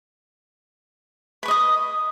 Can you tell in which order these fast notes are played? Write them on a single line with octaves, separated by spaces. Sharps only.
B4 C#6 D#5 D#6